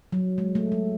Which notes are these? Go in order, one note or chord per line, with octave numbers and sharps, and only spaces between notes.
F#3
G#3
A3
G#3